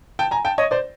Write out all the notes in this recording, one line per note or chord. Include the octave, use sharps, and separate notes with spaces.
G5 A5
G#5 A#5
G5 A5
C#5 D#5
C5 D5